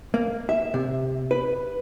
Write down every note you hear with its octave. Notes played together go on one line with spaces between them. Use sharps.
A#3
E5
C3
B4